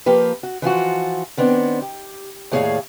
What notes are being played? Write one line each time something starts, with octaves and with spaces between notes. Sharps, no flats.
F3 A#3 G4 B4
F#4
E3 F3 F4 F#4
D#3 B3 C4 D4
G4
D#2 A2 G#4 C#5 D5 F5